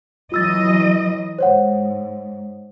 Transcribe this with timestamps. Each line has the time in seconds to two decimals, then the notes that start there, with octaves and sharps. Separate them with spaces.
0.32 E3 F#3 F4 D#5 E6 A6
1.39 G#2 C5 C#5 F#5